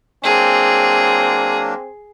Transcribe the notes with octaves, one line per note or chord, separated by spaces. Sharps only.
F#3 A#3 C4 D4 G#4